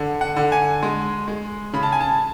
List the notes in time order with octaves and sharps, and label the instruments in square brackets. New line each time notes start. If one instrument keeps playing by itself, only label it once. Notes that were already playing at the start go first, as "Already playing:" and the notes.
Already playing: [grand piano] D3
F#5
D3
G#5
G#3
G#3
C#3 B5
A5
G#5
A5